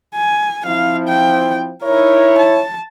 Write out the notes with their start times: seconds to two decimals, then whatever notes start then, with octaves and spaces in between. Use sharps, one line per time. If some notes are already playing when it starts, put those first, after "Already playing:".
0.15 G#5
0.66 F3 C4 E4 F5
1.08 G5
1.83 D#4 E4 A#4 C#5
2.38 A5